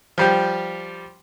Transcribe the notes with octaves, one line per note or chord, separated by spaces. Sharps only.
F3 G3 G4